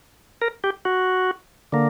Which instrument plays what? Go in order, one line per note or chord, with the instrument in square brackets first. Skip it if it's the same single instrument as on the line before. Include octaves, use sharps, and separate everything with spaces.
[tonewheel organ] A#4
G4
F#4
D3 A#3